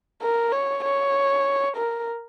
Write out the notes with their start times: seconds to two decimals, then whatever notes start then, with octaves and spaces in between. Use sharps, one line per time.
0.22 A#4
0.52 C#5
0.84 C#5
1.77 A#4